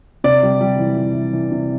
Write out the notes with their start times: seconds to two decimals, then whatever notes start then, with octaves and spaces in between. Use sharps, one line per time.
0.24 C3 D5
0.43 G3
0.61 G3
0.79 E3
0.97 G3
1.15 E3
1.33 E3
1.51 C3